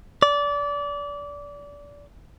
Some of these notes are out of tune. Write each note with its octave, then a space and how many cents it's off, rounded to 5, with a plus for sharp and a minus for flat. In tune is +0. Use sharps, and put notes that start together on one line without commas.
D5 -25